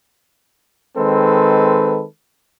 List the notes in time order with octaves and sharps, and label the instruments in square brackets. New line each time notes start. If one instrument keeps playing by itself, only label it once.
[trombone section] D#3 G#3 C4 A4 B4